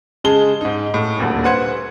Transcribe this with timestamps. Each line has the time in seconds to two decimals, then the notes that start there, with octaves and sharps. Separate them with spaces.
0.24 C#3 G#3 G#4 A5 G7
0.61 G#2 D#4
0.94 A2
1.19 D#1 D2 A#2
1.44 B4 C5 F#5 G#6 C#7